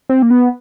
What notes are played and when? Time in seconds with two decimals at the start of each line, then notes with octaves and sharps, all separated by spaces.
0.09 C4
0.22 A#3
0.30 B3